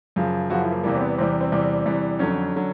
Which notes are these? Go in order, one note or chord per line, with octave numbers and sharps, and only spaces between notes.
F#2 C#3 F3
F#2 C#3 F3 F#4
E4
A#3
E2 C3 E3 G3 A#3
C4
B3
E2 C3 E3 G3 C4
C4
E2 C3 E3 G3
E2 C3 E3 G3
F2 D3 F#3 C#4
D3 F#3